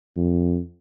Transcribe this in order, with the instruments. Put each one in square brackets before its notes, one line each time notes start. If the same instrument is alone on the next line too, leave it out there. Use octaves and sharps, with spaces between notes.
[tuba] F2